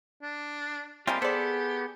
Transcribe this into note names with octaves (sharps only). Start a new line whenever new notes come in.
D4
G3 G#3 A#3 C4 F4 G4
B3 G#4 A4 C5 D5